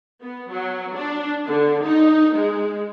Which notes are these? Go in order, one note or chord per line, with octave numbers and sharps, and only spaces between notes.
B3
F#3
D4
D3
D#4
G#3